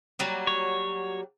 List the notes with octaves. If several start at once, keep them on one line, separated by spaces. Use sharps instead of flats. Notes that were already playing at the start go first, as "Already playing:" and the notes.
F#3 G3 A#3
C#5